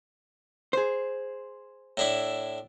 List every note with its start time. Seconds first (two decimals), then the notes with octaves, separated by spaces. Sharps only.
0.73 G#4 C5
1.97 A2 D4 E4